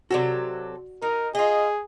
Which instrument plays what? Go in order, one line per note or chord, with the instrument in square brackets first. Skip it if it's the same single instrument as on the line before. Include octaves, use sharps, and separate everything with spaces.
[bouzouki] C3 F#3 A4 [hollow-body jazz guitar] F#4 D5
[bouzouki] D#4 [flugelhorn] A#4
[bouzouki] F4 D#5 [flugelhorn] G#4